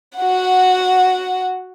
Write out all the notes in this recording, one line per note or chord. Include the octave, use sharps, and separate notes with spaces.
F#4 F#5